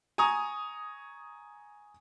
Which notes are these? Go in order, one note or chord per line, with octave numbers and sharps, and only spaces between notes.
G#5 A#5 C#6 D#6